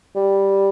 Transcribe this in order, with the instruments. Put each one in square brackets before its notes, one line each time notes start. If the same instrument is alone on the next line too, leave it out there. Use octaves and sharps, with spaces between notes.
[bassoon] G3